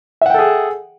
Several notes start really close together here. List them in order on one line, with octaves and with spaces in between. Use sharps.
E5 F#5 G5 A4 G#4